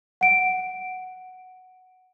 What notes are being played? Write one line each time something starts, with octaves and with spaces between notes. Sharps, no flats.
F#5 D7